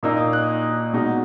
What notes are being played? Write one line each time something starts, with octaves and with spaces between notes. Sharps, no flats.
A#2 A#3 D#4 E6
D#6
F#6
B2 G#3 D#4